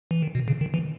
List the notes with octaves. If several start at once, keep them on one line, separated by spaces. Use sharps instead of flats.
E3
D#3
B2
C#3
D#3
E3